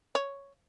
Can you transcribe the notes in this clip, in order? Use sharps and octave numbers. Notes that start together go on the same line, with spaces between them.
C#5